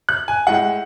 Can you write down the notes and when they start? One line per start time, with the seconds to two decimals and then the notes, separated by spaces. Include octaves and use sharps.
0.09 F#6
0.28 G#5
0.47 A2 G#3 F#5